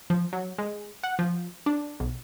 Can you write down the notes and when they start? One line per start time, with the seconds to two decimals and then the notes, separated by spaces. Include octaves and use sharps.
0.10 F3
0.33 F#3
0.58 G#3
1.04 F#5
1.19 F3
1.66 D4
2.00 B1